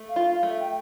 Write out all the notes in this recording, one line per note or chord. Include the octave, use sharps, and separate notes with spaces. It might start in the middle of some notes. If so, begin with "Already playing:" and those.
Already playing: A3
F5
F4
F5
A3
E5
G5